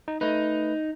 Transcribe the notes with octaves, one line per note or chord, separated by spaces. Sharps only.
D#4
A3 D#4 B4